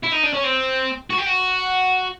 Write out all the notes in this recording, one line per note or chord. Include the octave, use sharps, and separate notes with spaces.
E4
D#4
D4
C#4
C4
F#4
G4
F#4